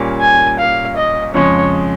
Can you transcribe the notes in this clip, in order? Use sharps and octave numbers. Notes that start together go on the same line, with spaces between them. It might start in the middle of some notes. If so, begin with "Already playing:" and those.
Already playing: A#2 G3 A#3 C#4
G#5
F5
D#5
F2 C#3 F3 G#3 C#5